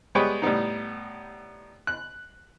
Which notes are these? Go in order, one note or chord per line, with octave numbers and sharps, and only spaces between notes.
G3 G#3 B3 G4 B4 C#5
A2 G3 B3 D#4
F#6